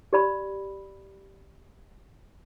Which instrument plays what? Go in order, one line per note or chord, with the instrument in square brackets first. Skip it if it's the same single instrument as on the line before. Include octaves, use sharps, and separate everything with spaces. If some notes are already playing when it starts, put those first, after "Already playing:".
[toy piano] G4 D5 B5